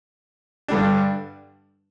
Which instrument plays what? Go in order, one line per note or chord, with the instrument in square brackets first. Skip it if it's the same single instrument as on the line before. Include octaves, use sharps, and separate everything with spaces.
[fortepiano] G2 D3 G3 D4